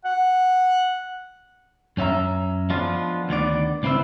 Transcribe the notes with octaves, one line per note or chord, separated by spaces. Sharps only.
F#5
F#2 C#4 F4 E5 A#5
F3 G#3 B3 D4 F4
D2 D#3 B3 D5
C#2 C4 E4 B4 E5